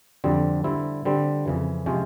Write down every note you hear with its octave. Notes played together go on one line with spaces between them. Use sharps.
F2 D3 G3 C4
D3 G3 C4 E4
D3 G3 C4
F2 C#3 E3
C3 F3 G#3 C#4